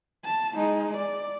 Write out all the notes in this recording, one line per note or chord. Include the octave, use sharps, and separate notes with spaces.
A5
G#3 D#4
D5